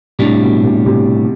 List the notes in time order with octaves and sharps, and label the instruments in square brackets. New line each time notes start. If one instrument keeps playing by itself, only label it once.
[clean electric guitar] A2 G3 D4 [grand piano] C3
[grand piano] B2
C3
C3